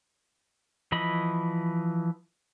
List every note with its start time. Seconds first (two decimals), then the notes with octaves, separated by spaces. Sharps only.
0.92 E3 F3 D#5 B5